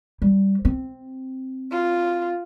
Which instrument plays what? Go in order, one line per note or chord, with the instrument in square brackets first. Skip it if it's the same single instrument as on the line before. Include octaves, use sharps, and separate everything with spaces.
[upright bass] G3
C4
[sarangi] F4